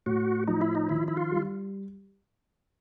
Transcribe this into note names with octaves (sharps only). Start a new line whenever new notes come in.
A2 F#4
F3 D#4
E4
D#4
D#3 E4
E4
F4
G3